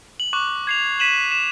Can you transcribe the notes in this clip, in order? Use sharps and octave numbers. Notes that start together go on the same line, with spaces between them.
F#7
C#6 D6 F#6
G#6 C7 F7
B6 D#7 E7 F#7
E7